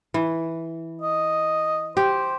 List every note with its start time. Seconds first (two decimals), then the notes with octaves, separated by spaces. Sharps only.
0.14 E3
1.01 D#5
1.97 G4 C5